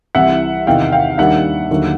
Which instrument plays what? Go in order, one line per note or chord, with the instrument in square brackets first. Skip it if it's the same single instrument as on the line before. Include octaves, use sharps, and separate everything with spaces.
[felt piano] C2 C3 E3 G3 [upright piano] E5 F#5
[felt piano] E2 C3 D#3 [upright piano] F5 G5
[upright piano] F5 G5
[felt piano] D#2 D#3 G3 A#3 D4 [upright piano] E5 F#5
[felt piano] D#2 D3 F#3 A#3